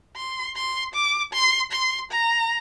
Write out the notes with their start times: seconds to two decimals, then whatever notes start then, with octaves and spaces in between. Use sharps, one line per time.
0.16 C6
0.56 C6
0.94 D6
1.33 C6
1.72 C6
2.11 A#5